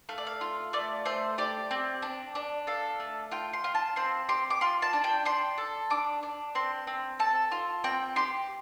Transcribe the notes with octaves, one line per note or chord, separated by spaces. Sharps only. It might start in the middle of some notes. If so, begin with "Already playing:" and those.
A3 F5
D5
F5
F4
A3 D5
A3 C5
G4 D5
C4
D4
D4
A4 F5
A3
F4 G5
C6
F4
A5
C4 C6
G4 C6
D6
F4 C6
A5
D4
G5
D4 C6
A4
D4 D6
D4
C4 C6
C4
A4 A5
F4
C4 G5
G4 C6